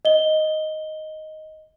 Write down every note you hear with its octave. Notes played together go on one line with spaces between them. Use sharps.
D#5 G7